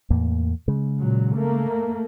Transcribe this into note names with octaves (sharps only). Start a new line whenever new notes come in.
E2 A2 A#3
C#3 G#3
A#2 F#3
A3 A#3